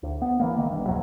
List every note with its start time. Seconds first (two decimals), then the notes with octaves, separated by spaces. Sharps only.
0.03 D2
0.22 B3
0.40 E3 G3 A#3
0.56 C2 D#3 A#3
0.70 G1 G2
0.87 D1 C2 F2 F#3